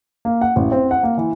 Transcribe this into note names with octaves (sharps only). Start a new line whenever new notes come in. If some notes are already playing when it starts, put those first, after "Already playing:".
A#3
F#5
A1
C4
F#5
A#3
E3